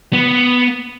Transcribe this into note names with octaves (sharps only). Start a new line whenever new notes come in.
B3